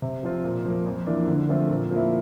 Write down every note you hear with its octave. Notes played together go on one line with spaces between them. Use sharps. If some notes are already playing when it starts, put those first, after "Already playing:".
C3
F3 C4 F4
A#2
F3 A#3
F2
E3 A#3 D4
D3
F3 A3 C4 F4
A#2
F3 A#3 E4